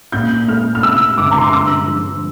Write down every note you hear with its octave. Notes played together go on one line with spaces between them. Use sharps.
A#2 G6
A3 F6
F6
C3 E6
G1 D6
A#5
C6
D6
G2 E6
F3